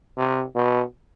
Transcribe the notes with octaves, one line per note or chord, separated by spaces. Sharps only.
C3
B2